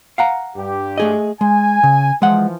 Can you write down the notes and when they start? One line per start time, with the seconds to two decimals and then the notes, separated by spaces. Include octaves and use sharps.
0.18 F5 F#5 A#5
0.56 G2 G4
0.98 A3 G#4 D#5
1.41 G#3 G#5
1.83 C#3
2.22 E3 F3 G#3 F#5